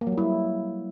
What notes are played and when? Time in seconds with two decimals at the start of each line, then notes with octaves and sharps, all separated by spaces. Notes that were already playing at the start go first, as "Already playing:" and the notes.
0.01 A#3
0.07 F#3
0.12 G3
0.18 E4